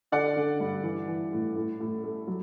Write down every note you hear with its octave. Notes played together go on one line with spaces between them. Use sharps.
D3 D5 F#5
D3
G2
E3
E3
A2
A2
A2
A3
F#3